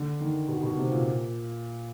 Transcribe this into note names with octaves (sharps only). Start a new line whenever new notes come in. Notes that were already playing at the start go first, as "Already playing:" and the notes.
Already playing: D3
D#3
B2
B2
C3
A#2